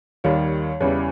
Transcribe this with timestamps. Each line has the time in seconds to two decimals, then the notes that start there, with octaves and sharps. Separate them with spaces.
0.24 D#2 D#3 G3 C#5
0.80 E2 C#3 E3 G3 C#5